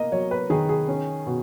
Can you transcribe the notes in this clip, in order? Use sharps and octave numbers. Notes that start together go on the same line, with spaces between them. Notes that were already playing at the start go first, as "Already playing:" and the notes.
Already playing: A#3 D#5
F#3 C#5
B4
D#3 G#4
G#4
C#4
B2